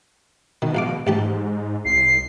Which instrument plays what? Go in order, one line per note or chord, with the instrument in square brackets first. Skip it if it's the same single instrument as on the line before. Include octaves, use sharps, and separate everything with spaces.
[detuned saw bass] B2 [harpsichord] D#3
[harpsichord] A#1 F5 D6
[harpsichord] A1 G4 A5 [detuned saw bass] G#2
[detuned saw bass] C2 [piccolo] C7